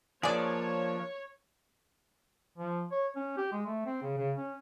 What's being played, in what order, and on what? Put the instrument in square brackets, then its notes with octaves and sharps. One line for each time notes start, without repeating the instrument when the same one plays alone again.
[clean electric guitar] F3 D4 [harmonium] A#3 [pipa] G#4 D5 [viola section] C#5
[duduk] F3
C#5
C#4
G4
G#3
A3
C4
C#3
C#3
C#4